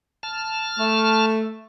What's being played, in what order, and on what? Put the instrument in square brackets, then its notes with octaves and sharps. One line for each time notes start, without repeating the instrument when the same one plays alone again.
[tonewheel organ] A5 F6
[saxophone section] A3